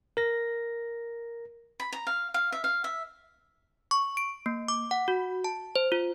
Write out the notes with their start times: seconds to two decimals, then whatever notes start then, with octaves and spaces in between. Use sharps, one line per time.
0.17 A#4 A#6
1.80 B5
1.92 A#5
2.07 F5
2.34 F5
2.52 E5
2.64 F5
2.84 E5
3.91 C#6
4.17 D7
4.46 A#3
4.68 D6
4.91 F#5
5.08 F#4
5.44 A5
5.76 C5
5.92 F4